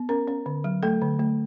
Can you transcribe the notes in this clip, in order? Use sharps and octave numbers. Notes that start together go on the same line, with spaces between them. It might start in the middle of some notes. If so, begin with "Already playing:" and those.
Already playing: B3
C#4 A#4
C#4
D3
F#3
A3 A4
D3
A3